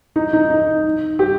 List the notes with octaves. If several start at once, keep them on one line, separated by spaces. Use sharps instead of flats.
D#4
D#4
D#4
G4